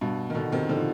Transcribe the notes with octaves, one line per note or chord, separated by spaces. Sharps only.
G2 B2
D#3
B2 D3
C3 D#3
D3 F3